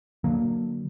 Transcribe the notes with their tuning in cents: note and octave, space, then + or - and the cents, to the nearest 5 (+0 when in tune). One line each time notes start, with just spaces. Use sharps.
D3 +10 F#3 +0 A#3 +0